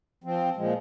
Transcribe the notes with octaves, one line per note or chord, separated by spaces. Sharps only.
F3 C4
A#2 F3 G#3